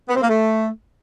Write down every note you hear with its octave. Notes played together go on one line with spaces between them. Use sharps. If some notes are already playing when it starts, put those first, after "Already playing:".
B3
C4
A#3
A3